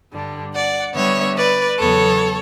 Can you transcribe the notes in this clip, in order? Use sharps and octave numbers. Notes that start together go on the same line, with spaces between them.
G2 D3 G3 D4
D5 F#5
D3 G3 B3 C#5 E5
B4 D5
E2 C#3 F#3 B3 A4 C#5